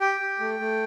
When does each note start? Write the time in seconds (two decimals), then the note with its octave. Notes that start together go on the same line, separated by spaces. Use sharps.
0.01 G4 G5
0.20 G4
0.40 A3
0.59 A3